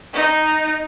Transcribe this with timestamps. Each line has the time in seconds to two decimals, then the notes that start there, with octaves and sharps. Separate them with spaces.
0.14 D#4